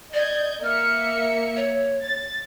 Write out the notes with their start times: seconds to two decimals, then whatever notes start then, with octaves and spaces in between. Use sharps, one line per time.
0.14 D5 D#5 G6 G#6
0.63 A#3 E5 F6 C#7
1.57 C#5
2.03 A6